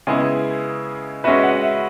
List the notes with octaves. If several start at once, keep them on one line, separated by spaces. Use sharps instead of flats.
C#3 G#3 B3 E4 G#5
G#3 C#4 F#4 B4 E5
F#5
E5